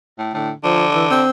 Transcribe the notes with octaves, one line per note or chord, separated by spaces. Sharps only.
A2
A2 D3
D3 F3
E3
C4